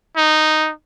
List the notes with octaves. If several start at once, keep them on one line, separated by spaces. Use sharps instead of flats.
D#4